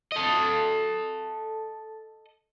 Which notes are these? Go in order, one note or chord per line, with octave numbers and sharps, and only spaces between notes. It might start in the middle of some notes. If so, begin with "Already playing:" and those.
A4 D#5